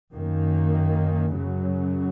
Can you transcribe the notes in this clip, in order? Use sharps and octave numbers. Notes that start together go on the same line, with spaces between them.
F#2 D#3 A#3
F#2 C#3 F#3